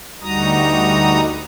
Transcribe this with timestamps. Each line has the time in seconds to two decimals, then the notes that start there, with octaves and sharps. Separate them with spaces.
0.21 D2 G3 D#4 F#4 A#5 D#6